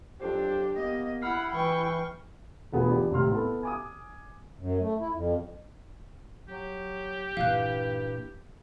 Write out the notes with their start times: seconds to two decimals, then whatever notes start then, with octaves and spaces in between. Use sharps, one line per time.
0.21 F2 F#3 D4 G4 C5
0.76 A#3 B3 D#5
1.22 E4 F#5 B5 F6 C7
1.53 E3 G5 C#6
2.72 E1 D2 B3 F4 G#4
2.89 E3 D4 F4 G4
3.11 G#1 A2 C3 C4 C6 F6
3.30 B3 E4 A4
3.63 G#5 D6 D#6
4.58 F#2
4.80 A3
4.99 E4
5.12 F2
6.49 F#3 G4
7.37 G2 A#2 E3 F5 F#6